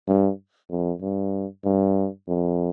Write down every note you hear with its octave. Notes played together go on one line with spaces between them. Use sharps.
G2
F2
G2
G2
F2